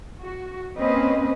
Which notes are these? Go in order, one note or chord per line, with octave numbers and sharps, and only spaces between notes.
F#4
A#3 C4 C#4 B4 C5 D#5